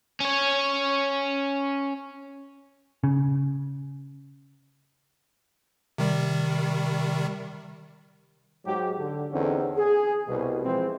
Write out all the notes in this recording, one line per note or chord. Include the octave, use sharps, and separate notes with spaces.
C#4 C#5
C#3
C3 D#3 G3
G#2 F#3 G#3 G4
D3
E2 D3 C4 C#4 D#4 A4
G#4
C2 B2
E3 F3 G#3 C4